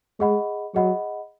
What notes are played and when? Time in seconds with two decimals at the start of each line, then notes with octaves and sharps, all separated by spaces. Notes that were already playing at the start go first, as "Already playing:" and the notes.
0.19 G#3 G#4 D#5 F#5 B5
0.74 F#3 G#4 D#5 F#5 B5